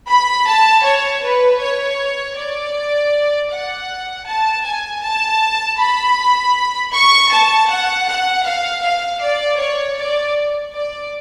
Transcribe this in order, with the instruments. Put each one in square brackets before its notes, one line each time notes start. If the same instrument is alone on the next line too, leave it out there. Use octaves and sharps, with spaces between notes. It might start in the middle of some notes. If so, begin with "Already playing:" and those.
[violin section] B5
A5
C#5
B4
C#5
D5
F#5
A5
G#5
A5
B5
C#6
A5
F#5
F#5
F5
F5
D5
C#5
D5
D5